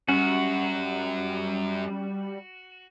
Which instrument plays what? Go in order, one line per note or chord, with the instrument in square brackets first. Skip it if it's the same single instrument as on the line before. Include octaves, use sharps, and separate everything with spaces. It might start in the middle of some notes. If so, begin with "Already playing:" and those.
[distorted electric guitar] F#2 [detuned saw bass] G3 [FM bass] C#4 [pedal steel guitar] F#4